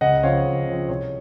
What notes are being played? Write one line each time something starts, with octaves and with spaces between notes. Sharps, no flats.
C#2 D#5 F#5
C#3 F3 C4 C#5 F5
C#2
C#3 F3 C4
C2 C#5